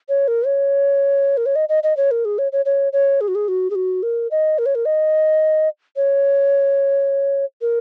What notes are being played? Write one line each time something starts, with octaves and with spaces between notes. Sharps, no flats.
C#5
A#4
C#5
A#4
C#5
D#5
D#5
D#5
C#5
A#4
G#4
C#5
C#5
C#5
C#5
G#4
F#4
G#4
F#4
G#4
F#4
A#4
D#5
A#4
C#5
A#4
D#5
C#5
A#4